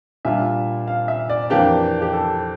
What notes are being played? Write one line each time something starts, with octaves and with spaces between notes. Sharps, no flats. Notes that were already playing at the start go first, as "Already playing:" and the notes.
A#2 G3 D4 F4 E5
F5
E5
D5
F2 E3 A#3 D4 G4
G4
A4